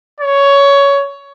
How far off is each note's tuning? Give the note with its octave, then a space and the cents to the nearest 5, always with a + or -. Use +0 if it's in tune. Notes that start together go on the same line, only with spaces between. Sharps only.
C#5 +15